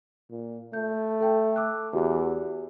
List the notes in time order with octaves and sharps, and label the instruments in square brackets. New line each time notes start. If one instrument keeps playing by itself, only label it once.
[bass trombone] A#2
[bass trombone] A3 [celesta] G6
[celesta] A4 G5 A5
D6 E6 F#6
[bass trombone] E2 [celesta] F#4 G4